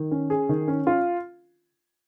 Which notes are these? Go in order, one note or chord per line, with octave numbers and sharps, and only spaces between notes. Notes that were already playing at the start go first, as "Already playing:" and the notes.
Already playing: D#3
C#4
G#4
D#3
C#4
F4